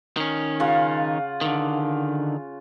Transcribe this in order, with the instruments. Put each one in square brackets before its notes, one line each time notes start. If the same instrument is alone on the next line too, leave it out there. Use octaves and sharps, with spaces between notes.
[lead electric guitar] D#3 C#4
[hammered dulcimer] C#3 F4 F#5
[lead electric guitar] D3 D#3